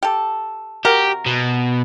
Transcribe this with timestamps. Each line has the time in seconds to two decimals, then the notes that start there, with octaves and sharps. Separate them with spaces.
0.03 G4 A4
0.85 C3 F#4 G4 A#4
1.26 B2